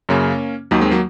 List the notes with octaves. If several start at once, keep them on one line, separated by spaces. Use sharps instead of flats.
F#2 C#3 A#3 C#4
D#2 D#3 F#3 A#3
G#3 C4
F#3 A#3